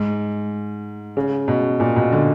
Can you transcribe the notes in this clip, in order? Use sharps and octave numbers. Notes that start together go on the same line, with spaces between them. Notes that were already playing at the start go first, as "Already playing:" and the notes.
Already playing: G#2
C#3
B2
A#2
B2
D3